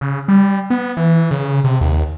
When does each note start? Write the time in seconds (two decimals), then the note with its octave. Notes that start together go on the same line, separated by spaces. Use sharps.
0.01 C#3
0.28 G3
0.70 B3
0.97 E3
1.31 C#3
1.64 C3
1.81 D#2